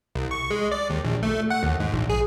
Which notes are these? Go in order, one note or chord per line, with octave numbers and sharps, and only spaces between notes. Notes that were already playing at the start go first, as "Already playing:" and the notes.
C2
C#6
G#3
D5
D#2
A#1
A3
F#5
D#2
G#2
A#1
G#4